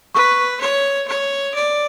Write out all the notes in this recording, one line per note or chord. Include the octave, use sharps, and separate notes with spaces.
B4 C#6
C#5
C#5
D5